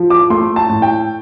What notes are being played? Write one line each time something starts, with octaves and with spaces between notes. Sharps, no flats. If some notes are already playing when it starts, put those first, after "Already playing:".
Already playing: F3
D6
A3 C6
A5
A2
G5